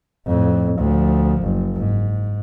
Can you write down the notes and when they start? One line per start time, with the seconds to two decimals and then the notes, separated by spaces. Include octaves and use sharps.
0.26 F2 A2
0.78 D2 F3
1.41 F#1
1.77 G#2